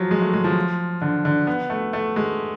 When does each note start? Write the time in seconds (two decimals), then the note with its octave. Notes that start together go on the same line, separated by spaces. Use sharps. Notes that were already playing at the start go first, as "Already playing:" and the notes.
Already playing: F3 F#3
0.11 G#3
0.22 A3
0.33 G#3
0.44 F3
1.02 D3
1.25 D3
1.47 B3
1.70 A3
1.93 A3
2.16 G#3